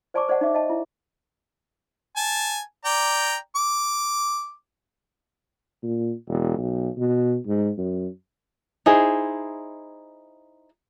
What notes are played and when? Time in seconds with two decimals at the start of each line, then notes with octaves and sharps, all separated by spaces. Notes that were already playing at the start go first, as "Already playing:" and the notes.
0.14 C5 D5 G#5 A5 C#6 D6
0.28 C5 D5 D#5 F#5 A5
0.41 D#4 E5 D6
0.55 D#5 A5
0.70 E4
2.16 G#5 A5
2.85 D5 G5 A#5
3.56 D6
5.83 A#2
6.28 E1
6.57 B1
6.98 B2
7.47 G#2
7.78 F#2
8.86 D#4 E4 G#4 C5